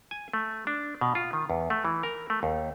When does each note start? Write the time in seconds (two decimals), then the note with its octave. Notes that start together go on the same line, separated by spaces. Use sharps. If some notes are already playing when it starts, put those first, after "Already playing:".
0.11 G#5
0.33 A3
0.67 D4
1.01 B2
1.15 F4
1.33 D#3
1.50 E2
1.70 A3
1.85 E3
2.03 A#4
2.30 A3
2.43 D#2